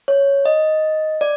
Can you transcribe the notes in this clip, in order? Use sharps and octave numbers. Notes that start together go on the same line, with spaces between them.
C#5
D#5
D5